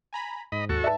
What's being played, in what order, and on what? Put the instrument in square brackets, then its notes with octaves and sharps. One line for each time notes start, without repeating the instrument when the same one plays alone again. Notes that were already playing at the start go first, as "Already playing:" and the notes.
[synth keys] G#5 A#5 B5
[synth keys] G#2 [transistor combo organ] D#5 B5
[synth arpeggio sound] D#2 [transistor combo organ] F#4 A4 C#6
[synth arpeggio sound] B4 D5 [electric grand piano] E5 A5